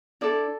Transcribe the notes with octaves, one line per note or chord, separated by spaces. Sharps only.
D4 E4 A4 D5